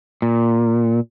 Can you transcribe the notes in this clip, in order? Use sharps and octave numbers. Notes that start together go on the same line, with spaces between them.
A#2